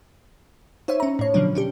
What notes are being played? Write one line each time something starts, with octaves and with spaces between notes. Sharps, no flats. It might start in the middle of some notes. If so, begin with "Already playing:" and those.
D#4 C5 C#5 E5
C#4 A#5
A2 C#5
B2 D3 F3 F#3 D4
C#4 D4 G4